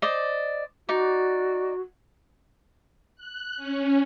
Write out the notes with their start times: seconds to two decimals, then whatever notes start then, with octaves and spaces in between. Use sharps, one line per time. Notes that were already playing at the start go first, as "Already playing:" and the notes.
0.02 C5 D5 D#5
0.89 D#4 F#4 D5
3.16 F#6
3.56 C#4